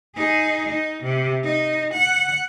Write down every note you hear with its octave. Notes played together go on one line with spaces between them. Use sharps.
D#4 G#4
D#4
C3
D#4
F#5